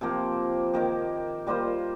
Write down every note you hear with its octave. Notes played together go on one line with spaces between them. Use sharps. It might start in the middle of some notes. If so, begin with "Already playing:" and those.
C3 F3 A#3 G4
D#3 A#3 G4
G3 A#3 F4 C5